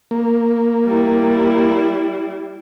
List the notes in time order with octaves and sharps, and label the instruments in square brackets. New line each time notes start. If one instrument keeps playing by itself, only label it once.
[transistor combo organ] A#3
[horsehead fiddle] G3 E4